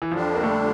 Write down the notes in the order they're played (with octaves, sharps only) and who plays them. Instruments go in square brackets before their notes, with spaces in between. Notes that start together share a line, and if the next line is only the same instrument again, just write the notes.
[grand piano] E3
[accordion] F2 D3 G3 D4 [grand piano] F3
[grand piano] A#3
A3